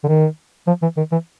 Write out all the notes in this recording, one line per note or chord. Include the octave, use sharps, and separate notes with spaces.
D3
D#3
F3
E3
D#3
E3